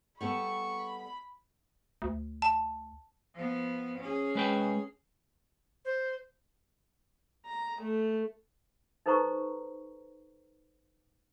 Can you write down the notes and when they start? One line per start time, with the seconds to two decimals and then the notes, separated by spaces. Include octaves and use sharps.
0.21 G3 B3 A4 B5 C#6
2.02 D2
2.42 A5
3.35 F3 B3
3.99 C#4 G#4
4.35 G#3 B4 G5
5.85 C5
7.46 A#5
7.82 A3
9.06 D#4 A4 B4 C5 A#5 C#6